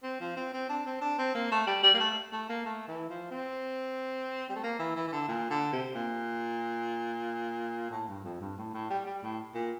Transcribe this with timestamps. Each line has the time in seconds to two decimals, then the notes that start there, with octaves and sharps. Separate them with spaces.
0.03 C4
0.20 F3
0.36 C4
0.53 C4
0.69 D4
0.86 C4
1.01 D4
1.18 C4
1.35 A#3
1.52 A3
1.67 G3
1.83 G3
1.94 A#3
2.00 A3
2.33 A3
2.49 A#3
2.65 A3
2.88 E3
3.09 F3
3.31 C4
4.49 G3
4.56 A3
4.63 A#3
4.79 E3
4.96 E3
5.07 E3
5.13 D3
5.28 A#2
5.50 D3
5.72 C3
5.95 A#2
7.90 A2
8.08 G2
8.24 F2
8.40 G2
8.57 A2
8.73 A2
8.90 G3
9.06 G3
9.23 A2
9.54 A#2